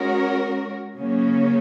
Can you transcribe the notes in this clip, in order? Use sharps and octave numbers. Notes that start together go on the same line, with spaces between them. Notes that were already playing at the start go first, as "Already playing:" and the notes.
Already playing: G#3 C#4 F#4 A#4
C#3 F#3 A#3 C#4